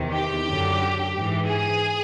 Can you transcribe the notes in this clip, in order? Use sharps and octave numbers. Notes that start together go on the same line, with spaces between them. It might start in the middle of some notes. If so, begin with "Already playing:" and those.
Already playing: E2 C3 D#3
G4
F#2 D3
G#2 E3
G#4